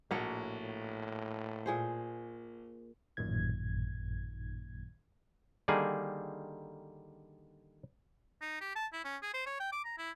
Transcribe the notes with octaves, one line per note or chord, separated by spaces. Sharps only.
A#1 A2 A#3 F#4 C#5
A#2 G#4 C5
A1 F#2 A#2 D#3 G#6
D3 D#3 G3 A#3 G#4
D#4
G4
A5
E4
C#4
G#4
C5
C#5
G5
D6
A#5
E4